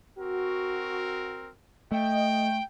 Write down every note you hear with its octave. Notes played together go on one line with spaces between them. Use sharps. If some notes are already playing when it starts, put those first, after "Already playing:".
C4 F#4 A#4
A3 D#5 G5